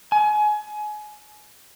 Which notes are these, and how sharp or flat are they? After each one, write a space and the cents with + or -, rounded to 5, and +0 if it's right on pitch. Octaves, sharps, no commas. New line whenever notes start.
G#5 +25